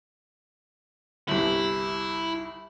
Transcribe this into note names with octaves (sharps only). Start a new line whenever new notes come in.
G1 C2 E4